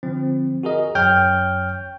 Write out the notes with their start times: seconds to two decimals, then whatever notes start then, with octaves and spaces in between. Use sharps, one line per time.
0.03 D3 F3 C4
0.63 F#4 G#4 A#4 D#5
0.95 G1 F#2 C#5 G5 F6 G6